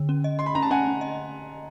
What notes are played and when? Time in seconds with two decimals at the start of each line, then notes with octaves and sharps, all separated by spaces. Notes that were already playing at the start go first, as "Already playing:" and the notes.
Already playing: D3
0.09 C#4
0.24 D#5
0.39 D#5 C6
0.46 B5
0.55 C#4 A#5
0.62 A5
0.70 C#4 F#5 G#5
0.86 C#4
1.01 D#5